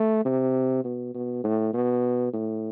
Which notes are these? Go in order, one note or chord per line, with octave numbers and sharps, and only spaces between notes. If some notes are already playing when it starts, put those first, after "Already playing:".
Already playing: A3
C3
B2
B2
A2
B2
A2